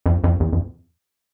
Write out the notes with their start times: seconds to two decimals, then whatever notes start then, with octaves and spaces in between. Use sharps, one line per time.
0.06 F2
0.24 F2
0.40 E2
0.53 F2